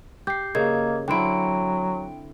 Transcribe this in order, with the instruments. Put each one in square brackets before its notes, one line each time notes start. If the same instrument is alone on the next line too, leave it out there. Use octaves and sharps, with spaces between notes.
[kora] G4 [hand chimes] G6 C7
[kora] C#3 [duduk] A#3 [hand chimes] A#4 D#5 G#6
[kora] D3 C4 E4 [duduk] F#3 [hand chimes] G5 D7